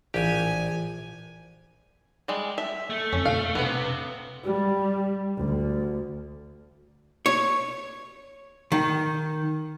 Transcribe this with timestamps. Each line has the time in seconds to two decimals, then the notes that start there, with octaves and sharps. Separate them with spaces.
0.14 A#1 A2 E3 G4 G#5
2.28 G3 G#3
2.58 E5
2.90 A3
3.13 F2 C#4
3.25 B2 F5
3.55 C3 B3 D4 B4
4.44 G3
5.37 D2
7.26 C#5
8.72 D#3